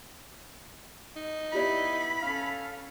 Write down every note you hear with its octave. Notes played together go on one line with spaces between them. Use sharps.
D#4
B3 E4 F4 G4 D5 B5
C#4 A4 F5